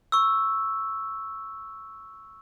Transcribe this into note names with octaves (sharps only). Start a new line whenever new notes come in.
C#6 E6